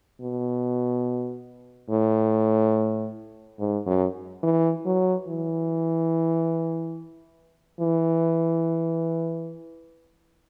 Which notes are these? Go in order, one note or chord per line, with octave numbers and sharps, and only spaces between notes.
B2
A2
G#2
F#2
E3
F#3
E3
E3